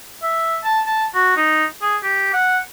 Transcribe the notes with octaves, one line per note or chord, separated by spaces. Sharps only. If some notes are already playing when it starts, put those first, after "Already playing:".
E5
A5
A5
F#4
D#4
G#4
G4
F#5